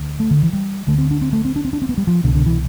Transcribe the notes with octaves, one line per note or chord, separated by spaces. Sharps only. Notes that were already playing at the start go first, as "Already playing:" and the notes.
Already playing: D2 D3
A3
D3
E3
G3
D2 D3 A3
C4
D4
C4
A3
C4
D4
C4
D4
C4
B3
G3
F3
C2 B2 D3
D3
E3